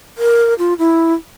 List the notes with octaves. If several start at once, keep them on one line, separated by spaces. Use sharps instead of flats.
A#4
F4
E4